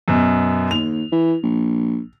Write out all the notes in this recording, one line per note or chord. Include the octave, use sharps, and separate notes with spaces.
F#2 B2
D#2 F7
E3
A#1